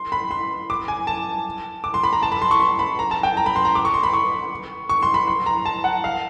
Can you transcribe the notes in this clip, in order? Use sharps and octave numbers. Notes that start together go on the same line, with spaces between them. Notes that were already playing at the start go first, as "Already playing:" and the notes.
Already playing: C6
B5
C6
D6
G#5
A5
D6
C6
B5
A#5
A5
B5
C6
C#6
C6
B5
A#5
A5
G5
A#5
B5
C6
A#5
D6
C#6
C6
B5
C#6
C#6
C6
B5
C6
A#5
A5
F#5
F5